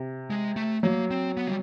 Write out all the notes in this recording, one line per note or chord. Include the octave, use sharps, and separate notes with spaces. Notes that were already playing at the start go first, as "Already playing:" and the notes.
Already playing: C3
G#3
A3
F#3 A#3
C4
B3
G3